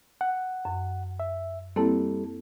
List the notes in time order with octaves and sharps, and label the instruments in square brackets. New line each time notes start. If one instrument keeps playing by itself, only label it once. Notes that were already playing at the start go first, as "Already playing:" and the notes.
[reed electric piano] F#5
[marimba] F#2
[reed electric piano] E5
[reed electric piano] G3 A4 [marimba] A#3 C4 E4